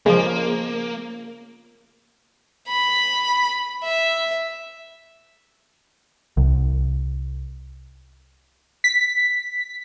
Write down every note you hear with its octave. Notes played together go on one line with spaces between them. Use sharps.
C#3 F3 G#3 A#3
B5
E5
C2
B6